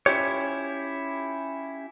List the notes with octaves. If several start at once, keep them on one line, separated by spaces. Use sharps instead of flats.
C#4 E4 F4 G4 C#5